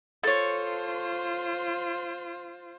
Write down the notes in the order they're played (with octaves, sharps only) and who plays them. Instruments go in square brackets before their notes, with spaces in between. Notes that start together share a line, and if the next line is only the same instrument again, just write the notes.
[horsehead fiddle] F4 C5 [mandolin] A4 C#5